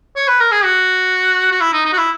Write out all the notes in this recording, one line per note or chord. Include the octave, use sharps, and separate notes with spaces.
C#5
B4
A#4
G#4
F#4
F#4
E4
D#4
D#4
F#4
E4